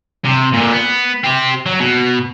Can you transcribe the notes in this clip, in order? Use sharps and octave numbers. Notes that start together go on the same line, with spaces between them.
C3
A#2 D3
B3
C4 G4
F#3
B2